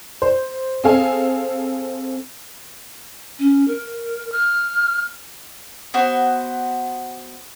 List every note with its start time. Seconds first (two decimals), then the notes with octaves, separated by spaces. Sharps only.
0.22 C5
0.84 C4 G#4 A4 F5 G#5
3.39 C#4
3.68 A#4
4.32 F6
5.94 B3 F#4 C5